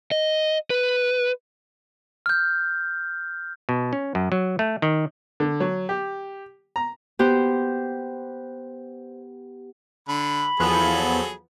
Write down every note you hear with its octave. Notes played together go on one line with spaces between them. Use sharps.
D#5
B4
F6 G6
B2
C#4
F#2
F#3
A3
D#3
D3
F#3
G4
A#5
B3 G4 C5
D3 B5
E2 F3 F#3 B3 G#4 A4